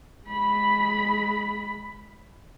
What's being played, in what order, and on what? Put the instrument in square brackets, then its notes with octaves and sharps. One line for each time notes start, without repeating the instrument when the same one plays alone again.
[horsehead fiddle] G#3 B5